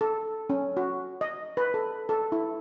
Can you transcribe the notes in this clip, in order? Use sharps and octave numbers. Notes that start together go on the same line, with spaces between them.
A4
C#4
F#4
D#5
B4
A4
A4
E4